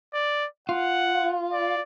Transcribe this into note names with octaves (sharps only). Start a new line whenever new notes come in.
D5
F4 F#5
D5